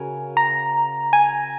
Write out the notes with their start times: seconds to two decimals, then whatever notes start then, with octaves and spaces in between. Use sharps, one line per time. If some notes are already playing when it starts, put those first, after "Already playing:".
Already playing: C#3 F#4 A#4 C#5 G#5
0.37 A#5
1.13 G#5